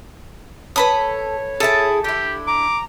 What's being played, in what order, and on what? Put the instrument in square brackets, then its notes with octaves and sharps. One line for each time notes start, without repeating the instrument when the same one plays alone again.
[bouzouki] A4 [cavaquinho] B4 B5 D#6 [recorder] C#5
[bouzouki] E4 G#4 [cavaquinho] A4 A5
[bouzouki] D3 E4 [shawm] G4
[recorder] A#5 [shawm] D6